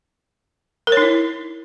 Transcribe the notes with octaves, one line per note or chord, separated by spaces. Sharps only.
D#4 E4 A#4 C#5